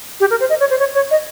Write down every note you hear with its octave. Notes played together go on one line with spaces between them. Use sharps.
G4
A#4
C5
D#5
C#5
C5
C#5
C#5
D#5